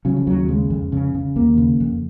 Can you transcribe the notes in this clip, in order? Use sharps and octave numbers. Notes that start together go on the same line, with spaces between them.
C#3 F#3
F3
D#2 F#3
C#3 G#3
F2
C#3
C#3
D#2 A#3
C#3
F2